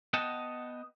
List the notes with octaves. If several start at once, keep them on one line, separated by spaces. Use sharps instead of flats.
B3 D#5 F#5 G5 A5